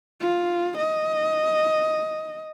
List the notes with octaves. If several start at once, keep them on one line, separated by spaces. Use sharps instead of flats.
F4
D#5